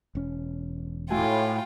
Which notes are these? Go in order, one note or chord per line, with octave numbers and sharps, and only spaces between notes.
E1 C#4
A2 A3 F4 F#4 G5 G#5